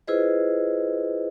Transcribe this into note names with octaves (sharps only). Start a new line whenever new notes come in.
E4 F4 G#4 B4 C5 D#5